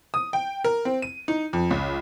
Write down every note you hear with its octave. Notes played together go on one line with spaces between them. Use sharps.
D#6
G5
A#4
C4
D#7
D#4
F2
C#2